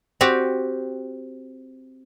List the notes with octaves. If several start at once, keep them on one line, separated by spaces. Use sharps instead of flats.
C4 F#4 G4